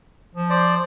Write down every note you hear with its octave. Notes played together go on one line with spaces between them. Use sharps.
F3
C5 D5